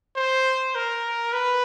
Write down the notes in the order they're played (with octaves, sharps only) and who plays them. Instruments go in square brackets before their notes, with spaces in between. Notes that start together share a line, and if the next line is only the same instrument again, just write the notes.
[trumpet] C5
A#4
B4